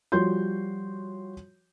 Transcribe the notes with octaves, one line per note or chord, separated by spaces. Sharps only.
F3 G3 F#4 C#5 C6 G6